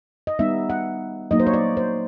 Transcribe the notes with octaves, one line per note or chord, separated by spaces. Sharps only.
D#5
G3 B3 D#4 E5
F#5
F#3 A#3 D#4 D#5
C5
C#5
D5
C5